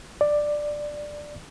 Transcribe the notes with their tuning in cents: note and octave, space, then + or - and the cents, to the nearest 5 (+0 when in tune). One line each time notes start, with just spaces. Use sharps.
D5 +10